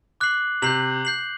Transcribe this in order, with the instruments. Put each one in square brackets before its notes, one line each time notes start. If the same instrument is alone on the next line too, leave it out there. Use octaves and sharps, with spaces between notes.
[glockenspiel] D6 F#6 C7 F#7
[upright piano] C3 [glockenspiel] G6 C7 F#7
[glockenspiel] G6 C7 F#7